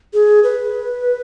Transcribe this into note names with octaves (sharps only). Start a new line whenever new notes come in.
G#4
B4